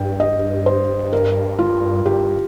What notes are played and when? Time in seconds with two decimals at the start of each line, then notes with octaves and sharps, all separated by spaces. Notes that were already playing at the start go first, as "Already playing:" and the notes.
Already playing: G2 G5
0.20 D#5
0.66 C5
1.13 A#4
1.59 F4
2.05 G2 G4